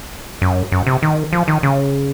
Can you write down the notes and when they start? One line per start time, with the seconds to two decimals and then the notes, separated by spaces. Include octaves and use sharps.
0.42 F#2
0.72 F#2
0.87 C3
1.02 D#3
1.33 F3
1.48 D#3
1.63 C#3